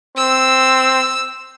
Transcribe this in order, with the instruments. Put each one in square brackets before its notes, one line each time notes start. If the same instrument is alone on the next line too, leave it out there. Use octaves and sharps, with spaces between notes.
[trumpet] C4 [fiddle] E6